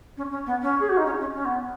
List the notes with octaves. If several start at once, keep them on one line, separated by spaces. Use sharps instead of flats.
C#4
C#4
B3
C#4
G#4
F#4
D#4
C#4
C#4
C#4
B3